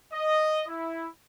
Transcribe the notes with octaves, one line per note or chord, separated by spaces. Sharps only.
D#5
E4